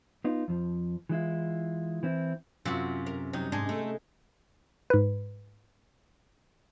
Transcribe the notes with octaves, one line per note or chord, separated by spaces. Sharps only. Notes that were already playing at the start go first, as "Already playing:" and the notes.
B3 D#4 F4
F2 F3
E3 G#3 E4 F4
E3 C4 E4
F#2 C3 F4 F#4
A#4
C3 F#3 D#4
G#2 G#3 D4 G#5
A3
G#2 B4